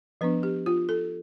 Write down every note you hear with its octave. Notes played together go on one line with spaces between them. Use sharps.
F3 B3 D4 B4
G4
F4
A4